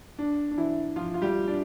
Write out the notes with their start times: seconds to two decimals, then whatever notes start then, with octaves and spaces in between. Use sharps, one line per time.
0.19 D4
0.51 D4
0.58 E3 E4
0.96 F3 F4
1.14 F4
1.22 G3 G4
1.48 D4 D5